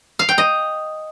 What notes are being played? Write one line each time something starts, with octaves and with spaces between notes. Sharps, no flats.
F5
G5
D#5